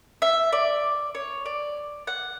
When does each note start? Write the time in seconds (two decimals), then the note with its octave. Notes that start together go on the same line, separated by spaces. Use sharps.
0.22 E5
0.53 D5
1.15 C#5
1.46 D5
2.07 F#5